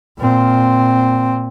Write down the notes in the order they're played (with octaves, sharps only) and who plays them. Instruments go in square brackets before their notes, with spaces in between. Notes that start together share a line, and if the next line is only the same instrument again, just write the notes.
[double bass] A#2 C4